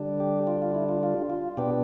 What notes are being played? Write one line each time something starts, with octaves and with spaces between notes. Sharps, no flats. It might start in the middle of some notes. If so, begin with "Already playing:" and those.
Already playing: D3 G3 D4
G4
F4
F4
E4
F4
F4
F4
B2 B3 D4 G4